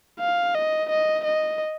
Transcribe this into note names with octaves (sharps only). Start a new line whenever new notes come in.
F5
D#5
D#5
D#5